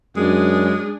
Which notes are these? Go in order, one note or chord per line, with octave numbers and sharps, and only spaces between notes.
F#2 G#3 D4 G#4